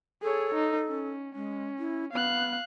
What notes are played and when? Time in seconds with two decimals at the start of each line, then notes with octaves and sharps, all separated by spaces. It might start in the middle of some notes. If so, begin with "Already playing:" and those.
0.23 G#4 A4 C#5
0.55 D#4
0.88 C#4
1.35 G#3 C#4
1.79 E4
2.13 B3 F5 F#6